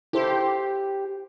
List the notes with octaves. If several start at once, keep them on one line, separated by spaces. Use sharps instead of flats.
E4 G4 A4 C5